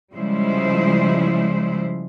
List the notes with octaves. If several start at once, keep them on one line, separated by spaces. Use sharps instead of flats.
C#3 F3 G3 G#3 E4 C5